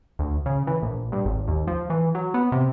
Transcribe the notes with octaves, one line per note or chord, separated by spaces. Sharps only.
D2
C#3
E3
A#1
G2
G#1
D#2
F3
E3
F#3
B3
C3